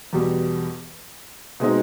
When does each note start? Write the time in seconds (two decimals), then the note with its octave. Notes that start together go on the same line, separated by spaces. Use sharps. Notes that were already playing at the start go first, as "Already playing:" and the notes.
0.13 E2 B2 G3
1.60 B2 G#3 C4 D#4